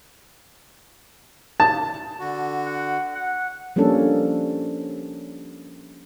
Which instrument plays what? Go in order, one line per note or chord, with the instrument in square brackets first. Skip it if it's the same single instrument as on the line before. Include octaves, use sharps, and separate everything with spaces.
[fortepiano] A5
[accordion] D3 F#4
[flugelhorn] F#5
F#5
[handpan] F3 G3 A#3 C#4 D4 A4